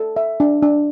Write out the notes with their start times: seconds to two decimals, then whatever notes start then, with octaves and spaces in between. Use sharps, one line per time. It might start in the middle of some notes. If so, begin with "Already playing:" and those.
Already playing: A4
0.16 E5
0.40 D4
0.63 D4